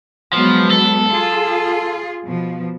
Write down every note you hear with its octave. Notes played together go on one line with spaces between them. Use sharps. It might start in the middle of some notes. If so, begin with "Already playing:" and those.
F3 F#3 G#3 B3
A4
F4 G#4
B2 F3